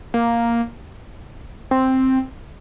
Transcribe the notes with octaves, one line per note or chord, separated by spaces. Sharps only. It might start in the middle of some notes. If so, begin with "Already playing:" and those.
A#3
C4